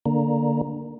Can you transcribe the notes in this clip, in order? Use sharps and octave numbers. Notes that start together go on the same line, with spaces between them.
D3 A#3